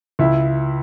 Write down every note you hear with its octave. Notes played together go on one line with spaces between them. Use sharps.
C#2 E4